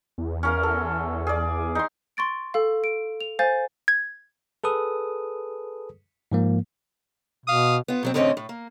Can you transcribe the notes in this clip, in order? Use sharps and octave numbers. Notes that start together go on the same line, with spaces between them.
E2
C#4 A#4 F5
A4
G#4 D5
D#4 C6
C6 C#6 A6 D7
A4 F5
D7
F7
C5 F5 G#5 G6 A6
G#6
G#4 A4 B4 D#6
G#2 F3 A#3
B2 F5 D#6
B3 F4
B2 F#3 C4
E2 A2 D3 C4 C#4 D#5
A2
A#3